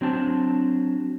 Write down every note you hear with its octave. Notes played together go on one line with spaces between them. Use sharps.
F#3 C4 D4 G#5 A5